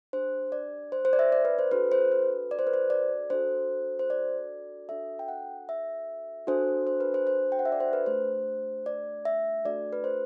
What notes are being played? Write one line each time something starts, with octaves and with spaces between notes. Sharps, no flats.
D4 G4 C5
D5
C5
C5
D5
E5
D5
B4
C5
D4 F#4 A4 B4
C5
B4
D5
C5
B4
C5
D5
D4 F#4 A4 C5
C5
D5
D4 F#4 A4 E5
G5
F#5
E5
D4 F#4 A4 C5
C5
B4
C5
C5
G5
F#5
E5
D5
C5
B4
A3 D4 G4 C5
D5
E5
A3 D4 F#4 A4 D5
B4
C5